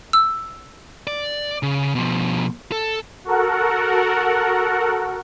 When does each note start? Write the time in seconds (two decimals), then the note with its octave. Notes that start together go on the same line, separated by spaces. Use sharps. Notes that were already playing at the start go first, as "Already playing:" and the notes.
0.13 E6
1.07 D5
1.63 C#3
1.95 B2 F3
2.72 A4
3.24 F#4 A4 A#4 F#5